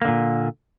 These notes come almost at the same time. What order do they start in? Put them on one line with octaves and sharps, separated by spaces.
A#3 D3 A#2